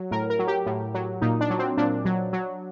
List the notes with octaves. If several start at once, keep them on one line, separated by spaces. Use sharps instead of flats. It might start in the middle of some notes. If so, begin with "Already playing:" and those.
Already playing: F#3
A2 A#4
A#4
F#3
G4
A2
F#3
A#2 D#4
D4
F#3
C4
A#2 D4
F#3
F#3